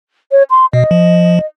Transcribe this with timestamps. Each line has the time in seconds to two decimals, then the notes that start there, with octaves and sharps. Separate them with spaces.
0.32 C#5
0.50 C6
0.73 B2 D#5
0.91 F3